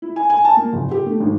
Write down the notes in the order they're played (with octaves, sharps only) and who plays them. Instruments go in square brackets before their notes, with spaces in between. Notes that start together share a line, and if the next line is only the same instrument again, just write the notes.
[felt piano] E4
G#5
G#5
A5
A#3
F#1
G4
A3
G#1